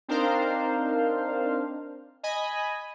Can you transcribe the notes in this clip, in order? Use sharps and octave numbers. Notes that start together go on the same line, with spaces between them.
C4 D4 D#4 A#4 C5 F5
D#5 G#5 B5